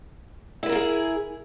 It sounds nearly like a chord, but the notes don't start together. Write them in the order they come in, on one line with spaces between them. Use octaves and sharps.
E4 B4 A#4 F4 G#4